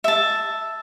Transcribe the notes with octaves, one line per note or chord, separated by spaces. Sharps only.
E5 A5